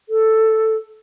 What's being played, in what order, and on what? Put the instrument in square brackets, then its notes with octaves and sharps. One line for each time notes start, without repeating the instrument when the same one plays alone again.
[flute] A4